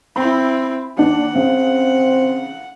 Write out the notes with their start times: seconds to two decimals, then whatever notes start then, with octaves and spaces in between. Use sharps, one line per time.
0.16 C4 E4 B5
0.98 D#2 D4 F#5
1.35 C#3 C4